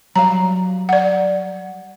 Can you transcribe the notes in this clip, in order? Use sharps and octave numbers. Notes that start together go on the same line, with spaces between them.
F#3 G3 F5 A#5
D5 F#5